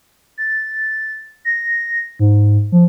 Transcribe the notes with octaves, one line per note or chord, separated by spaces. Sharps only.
A6
A#6
G#2
F3